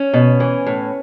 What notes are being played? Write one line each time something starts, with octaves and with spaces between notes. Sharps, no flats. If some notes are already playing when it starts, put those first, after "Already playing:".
Already playing: C#4
B2
E3
A2